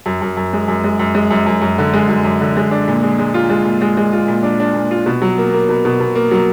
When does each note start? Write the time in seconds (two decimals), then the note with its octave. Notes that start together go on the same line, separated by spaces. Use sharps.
0.06 F#2
0.22 F#2
0.37 F#2
0.53 G#3
0.68 F#2
0.84 G#3
0.99 F#2
1.15 G#3
1.31 F#2
1.46 F#2
1.62 F#2
1.78 D3
1.94 G#3
2.09 F#2
2.25 F#2
2.41 D3
2.57 G#3
2.71 D4
2.88 A#2
3.03 G#3
3.19 G#3
3.34 F4
3.50 G#3
3.65 A#2
3.81 G#3
3.97 G#3
4.12 F4
4.28 A#2
4.43 D4
4.60 D4
4.75 A#2
4.91 F4
5.06 B2
5.22 F#3
5.38 A#3
5.53 A#3
5.69 B2
5.85 B2
6.00 B2
6.15 A#3
6.31 F#3